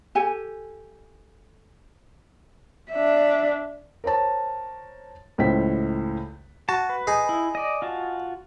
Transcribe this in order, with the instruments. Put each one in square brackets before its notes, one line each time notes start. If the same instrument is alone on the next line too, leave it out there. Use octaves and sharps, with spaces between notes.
[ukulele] G4 A4 G#5
[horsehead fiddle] D4 E5
[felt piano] A#4 C5 C#5 A5
C#2 A2 C5 G5 B6
[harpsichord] F#4 [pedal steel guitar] A5
[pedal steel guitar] B4
[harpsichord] D#4 G#4
[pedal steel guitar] E4
D5 D#5
F4 F#4 A5